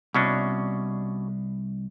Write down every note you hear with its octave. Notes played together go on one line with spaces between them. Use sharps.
C2 B2 C#4 D4